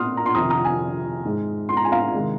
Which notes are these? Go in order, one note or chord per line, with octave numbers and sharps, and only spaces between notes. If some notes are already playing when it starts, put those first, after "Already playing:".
Already playing: A#2 A#3 C6 D#6 F6
A#5
C6
F2 C3 D#3 A#5 D#6
A#5 D#6
G#5
G#2 G#3
C6
A#5
G#5
F5 A#5
C3 D#3 G#3